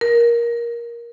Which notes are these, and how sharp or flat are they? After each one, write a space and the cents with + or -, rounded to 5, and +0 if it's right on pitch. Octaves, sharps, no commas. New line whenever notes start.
A#4 +15